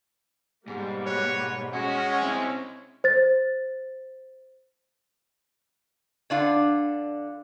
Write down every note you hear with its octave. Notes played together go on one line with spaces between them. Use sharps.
G#2 B2 G3 A#3
G#2 F#4 B4 C#5
G#3 C#4 F#4 C#5
C4 E4
C5 A6
D3 D4 F4